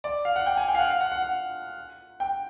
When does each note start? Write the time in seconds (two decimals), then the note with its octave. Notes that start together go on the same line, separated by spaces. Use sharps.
0.04 D5
0.25 F5
0.36 F#5
0.46 G5
0.57 G#5
0.68 G5
0.75 F5
0.79 F#5
0.90 F5
1.01 F#5
1.12 F#5
1.23 F#5
2.20 G5